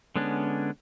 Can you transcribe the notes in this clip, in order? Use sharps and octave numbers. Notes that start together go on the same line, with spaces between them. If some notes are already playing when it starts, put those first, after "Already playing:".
D3 G#3 B3 C#4 D4